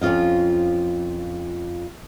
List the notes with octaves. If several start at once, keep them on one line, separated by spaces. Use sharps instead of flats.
F2 C#4 F4 D#5 F5